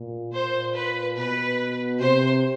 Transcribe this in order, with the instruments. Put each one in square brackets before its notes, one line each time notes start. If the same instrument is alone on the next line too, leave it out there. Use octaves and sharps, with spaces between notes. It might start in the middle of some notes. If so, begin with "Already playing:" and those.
Already playing: [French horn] A#2
[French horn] A#2 [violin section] C5
[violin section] B4
[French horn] B2 [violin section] B4
[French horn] C3 [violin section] C5